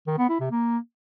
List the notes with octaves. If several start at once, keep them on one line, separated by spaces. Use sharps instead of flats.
D#3
B3
E4
C3
A#3